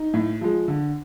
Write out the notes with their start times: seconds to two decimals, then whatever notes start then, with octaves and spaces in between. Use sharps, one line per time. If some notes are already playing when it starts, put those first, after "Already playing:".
Already playing: D#4
0.14 A2
0.41 F3 G#3
0.68 D3